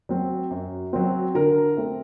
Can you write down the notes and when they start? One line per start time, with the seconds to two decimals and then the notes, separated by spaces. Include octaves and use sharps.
0.09 F#3 C4
0.51 F#2
0.93 F#3 C4
1.35 D3 A#4
1.77 A3 C4